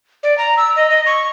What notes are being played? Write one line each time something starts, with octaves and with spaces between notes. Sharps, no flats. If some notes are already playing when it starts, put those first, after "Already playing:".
D5
A#5
E6
D#5
D#5
C#6